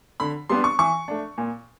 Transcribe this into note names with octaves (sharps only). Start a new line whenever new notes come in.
D3 B5
G3 B3 D4 C6
C#6
E3 C#6
A3 D4
A#2